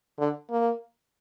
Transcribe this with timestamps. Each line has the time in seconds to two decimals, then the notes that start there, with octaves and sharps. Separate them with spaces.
0.19 D3
0.51 A#3